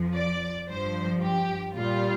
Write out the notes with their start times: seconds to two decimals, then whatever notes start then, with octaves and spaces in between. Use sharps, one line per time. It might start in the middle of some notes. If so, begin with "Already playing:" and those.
Already playing: F2 F3
0.15 D5
0.68 G2 F3 C5
1.22 G4
1.76 A#2 G3 F4